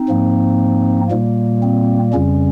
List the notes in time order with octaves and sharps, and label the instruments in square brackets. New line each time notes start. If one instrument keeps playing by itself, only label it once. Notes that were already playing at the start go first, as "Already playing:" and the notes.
Already playing: [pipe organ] C4 D#4
G#2 F3 A#3
A#2 G3 A#3
C4
F2 C#3 G3 C#4